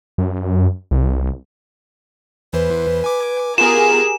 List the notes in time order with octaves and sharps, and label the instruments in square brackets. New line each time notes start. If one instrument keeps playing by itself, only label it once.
[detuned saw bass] F#2
C2
[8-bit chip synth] E2 E3 C5 [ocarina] B4
[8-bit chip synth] G#5 D6
[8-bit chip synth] B3 F4 [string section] G4 G#4 A#4 [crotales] E7